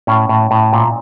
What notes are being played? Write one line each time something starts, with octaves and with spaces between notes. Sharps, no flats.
A2 C#4
A2
A2
A#2